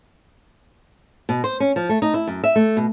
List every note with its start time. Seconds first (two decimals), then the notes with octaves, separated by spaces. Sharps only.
1.29 B2
1.44 C5
1.60 C#4
1.76 F3
1.89 A3
2.02 D#4
2.14 E4
2.27 F#2
2.44 E5
2.56 A3
2.77 B2